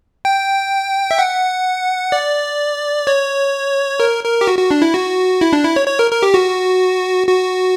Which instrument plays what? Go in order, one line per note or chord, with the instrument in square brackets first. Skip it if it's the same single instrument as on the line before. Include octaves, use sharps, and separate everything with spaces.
[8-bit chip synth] G5
E5
F#5
D5
C#5
A#4
A#4
G4
F#4
F#4
D4
E4
F#4
E4
D4
E4
C#5
C#5
A#4
A#4
G4
F#4
F#4